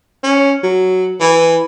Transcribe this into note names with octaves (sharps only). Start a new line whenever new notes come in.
C#4
F#3
E3